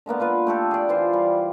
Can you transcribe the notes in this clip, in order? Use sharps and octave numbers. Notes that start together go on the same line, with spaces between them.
D3 G#3 A#3 B3
A#3 F4 B4
A3 G4 A4
G#4 D5
E3 F4 C5
G3